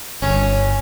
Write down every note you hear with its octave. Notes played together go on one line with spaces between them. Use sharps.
G1 C#4